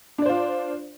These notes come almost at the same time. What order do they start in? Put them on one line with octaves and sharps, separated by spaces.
D4 D5 C5 F4